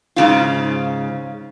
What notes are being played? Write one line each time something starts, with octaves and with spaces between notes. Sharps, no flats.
G#2 C#3 F4